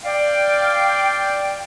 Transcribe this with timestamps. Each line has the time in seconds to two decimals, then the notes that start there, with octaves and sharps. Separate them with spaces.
0.04 D5 F5 G5